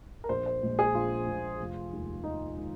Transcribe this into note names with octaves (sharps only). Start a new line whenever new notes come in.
A#4
A#1 C5
C5
A#2 G#3
G#4
A#1 F4
A#2
G#3
F1
D#2 D#3 G#3
F1 D#4
D#3 G#3